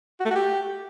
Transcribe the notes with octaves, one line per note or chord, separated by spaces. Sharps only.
F#4
A3
F#4
G4